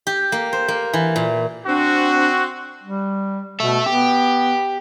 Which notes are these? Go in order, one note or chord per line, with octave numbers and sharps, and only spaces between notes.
G4
A#3
C5
A#3
E3
A#2
C4 D4 F#4
G3
B2 A4 E5
B3 G4